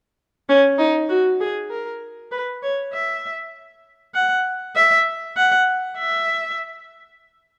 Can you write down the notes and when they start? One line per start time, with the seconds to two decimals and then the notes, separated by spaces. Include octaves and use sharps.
0.49 C#4
0.78 D#4
1.10 F#4
1.41 G#4
1.70 A#4
2.32 B4
2.63 C#5
2.93 E5
4.14 F#5
4.76 E5
5.37 F#5
5.98 E5